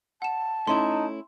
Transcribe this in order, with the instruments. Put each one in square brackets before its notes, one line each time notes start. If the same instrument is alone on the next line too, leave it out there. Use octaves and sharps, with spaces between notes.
[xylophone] F#5 E7 [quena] A5
[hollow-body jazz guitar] A3 C#4 E4 [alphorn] D#4 [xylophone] C6